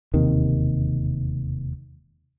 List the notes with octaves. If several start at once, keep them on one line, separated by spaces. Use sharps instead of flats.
E1 D#2 C3 D#3